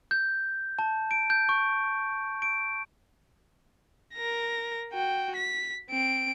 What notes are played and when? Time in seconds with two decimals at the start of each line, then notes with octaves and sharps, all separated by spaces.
0.11 G6
0.79 A5
1.11 D7
1.30 G6
1.49 C#6
2.42 D7
4.15 A#4 A#6
4.93 F#4 G5
5.36 B6
5.90 C4 D7